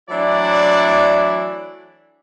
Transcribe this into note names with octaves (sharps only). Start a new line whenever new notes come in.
E3 F#3 A3 D4 E4 D5